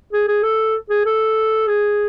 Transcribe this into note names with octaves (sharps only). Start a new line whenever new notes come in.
G#4
G#4
A4
G#4
A4
G#4